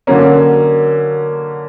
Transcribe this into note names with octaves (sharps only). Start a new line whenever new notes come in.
D3 F#3 A#3 C#4